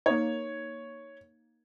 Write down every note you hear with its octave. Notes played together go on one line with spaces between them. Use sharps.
A#3 D#4 C#5